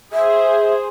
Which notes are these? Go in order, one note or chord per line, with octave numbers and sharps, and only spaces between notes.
G#4 C5 E5